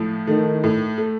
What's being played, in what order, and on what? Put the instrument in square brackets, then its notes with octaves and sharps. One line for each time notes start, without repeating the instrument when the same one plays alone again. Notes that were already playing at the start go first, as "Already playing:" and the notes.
Already playing: [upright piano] A2 F3
[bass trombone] D#3 [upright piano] A3
[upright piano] A2
A3